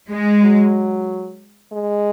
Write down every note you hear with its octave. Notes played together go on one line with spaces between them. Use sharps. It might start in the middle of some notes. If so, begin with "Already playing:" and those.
G#3
F#3
G#3